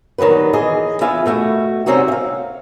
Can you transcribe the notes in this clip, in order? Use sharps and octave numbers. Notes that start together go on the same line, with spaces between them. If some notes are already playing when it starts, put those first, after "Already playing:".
D#2 D#3 F#3 G3 B4
E3 G#4 D#5
E3 B3 F4 E5 G#5
B2 A3 F#4
C3 G3 C4 C#4 D#4 F#4
E5 F5